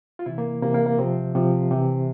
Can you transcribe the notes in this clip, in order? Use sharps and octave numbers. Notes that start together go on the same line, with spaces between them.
F4
C3 E3 E4
A#3
C3 E3 A#3
A#3
A#3
C3 F3 C4
C3 F3
C3 E3